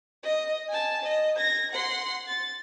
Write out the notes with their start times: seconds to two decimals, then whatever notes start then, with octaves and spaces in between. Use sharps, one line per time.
0.23 D#5
0.69 G#5 A5
1.03 D#5
1.36 G#6 A#6
1.71 F#5 C6
2.27 A6